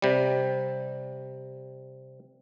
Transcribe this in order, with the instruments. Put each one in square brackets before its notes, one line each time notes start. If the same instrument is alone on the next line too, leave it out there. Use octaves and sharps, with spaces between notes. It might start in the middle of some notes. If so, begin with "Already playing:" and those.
[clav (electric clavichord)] C3 G3